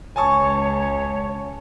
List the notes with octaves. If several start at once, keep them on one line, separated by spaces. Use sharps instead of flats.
C#2 C#3 C#5 G#5 A5 C#6